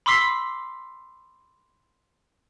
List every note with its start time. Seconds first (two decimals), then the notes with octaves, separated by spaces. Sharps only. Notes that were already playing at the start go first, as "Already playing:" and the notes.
0.06 B5 C6 D6 E6 B6 C7